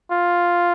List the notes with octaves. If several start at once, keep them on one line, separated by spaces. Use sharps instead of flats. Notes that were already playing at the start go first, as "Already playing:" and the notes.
F4